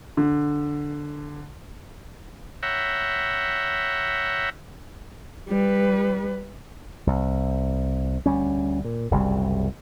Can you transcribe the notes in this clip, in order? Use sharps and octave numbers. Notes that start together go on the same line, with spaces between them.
D3
C#5 E5 F#5 G5 A#5 B5
G3 B4
C2
D2 G3 C#4
A#2
F#1 C2 C#3 G3